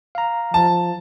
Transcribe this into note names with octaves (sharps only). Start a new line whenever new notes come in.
F5 A#5
F3 A5